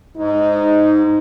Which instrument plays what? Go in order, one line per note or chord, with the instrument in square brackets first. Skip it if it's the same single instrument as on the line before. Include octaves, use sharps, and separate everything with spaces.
[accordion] G#2 [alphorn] D#4